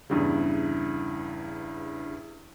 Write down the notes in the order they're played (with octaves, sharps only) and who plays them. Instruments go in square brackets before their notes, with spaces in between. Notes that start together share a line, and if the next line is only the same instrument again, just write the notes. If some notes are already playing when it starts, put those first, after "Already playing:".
[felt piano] E2 G2 C#3